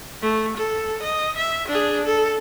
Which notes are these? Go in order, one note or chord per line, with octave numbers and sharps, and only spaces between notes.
A3
A4
D#5
E5
D4 G#4
A4